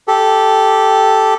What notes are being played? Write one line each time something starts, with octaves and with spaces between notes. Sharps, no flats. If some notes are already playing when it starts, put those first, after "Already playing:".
G4 A4